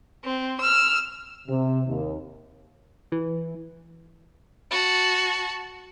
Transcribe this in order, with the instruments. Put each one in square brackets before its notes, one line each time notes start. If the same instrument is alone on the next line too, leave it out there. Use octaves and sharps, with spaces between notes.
[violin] C4
E6 F6
[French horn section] C3
D#2
[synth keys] E3
[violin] F#4 A5